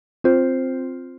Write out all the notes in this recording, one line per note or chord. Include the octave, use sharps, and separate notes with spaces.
C4 F4 C5